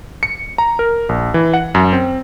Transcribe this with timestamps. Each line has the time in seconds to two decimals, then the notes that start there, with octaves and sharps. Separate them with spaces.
0.23 C#7
0.58 A#5
0.79 A#4
1.09 A#1
1.34 E3
1.54 F#5
1.75 F#2
1.93 C4